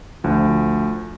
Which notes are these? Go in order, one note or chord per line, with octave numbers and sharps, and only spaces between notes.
D2 F3